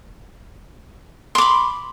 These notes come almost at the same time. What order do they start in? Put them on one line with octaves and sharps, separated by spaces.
C6 D6 B5